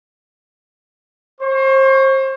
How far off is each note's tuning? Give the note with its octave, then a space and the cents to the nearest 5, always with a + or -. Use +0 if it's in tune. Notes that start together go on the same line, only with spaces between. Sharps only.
C5 +35 C#6 +0